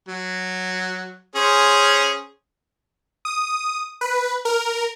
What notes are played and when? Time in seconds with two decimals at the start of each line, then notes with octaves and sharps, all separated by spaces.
0.08 F#3
1.36 C#4 G#4 C5
3.25 D#6
4.01 B4
4.45 A#4